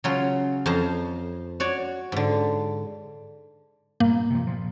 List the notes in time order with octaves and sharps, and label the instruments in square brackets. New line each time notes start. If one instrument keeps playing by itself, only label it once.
[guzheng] C#3 F#3 F4
F2 C5 F5 A5 A#5
F#4 C#5 D5
G#2 D3
[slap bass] G2 A#2 [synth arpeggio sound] A#3
[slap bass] C3 F3
A#2 F3